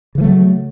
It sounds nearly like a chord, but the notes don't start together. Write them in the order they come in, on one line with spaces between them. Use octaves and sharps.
C#3 E3 A3 F#3